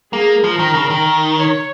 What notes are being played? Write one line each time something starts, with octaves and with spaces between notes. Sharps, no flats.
A#3 G#4
F3 A#4
D#3
C#3
D#3
C#5